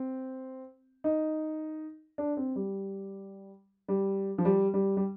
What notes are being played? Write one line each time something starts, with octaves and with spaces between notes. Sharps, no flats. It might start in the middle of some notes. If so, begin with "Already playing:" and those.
Already playing: C4
D#4
D4
C4
G3
G3
F3
G3
G3
G3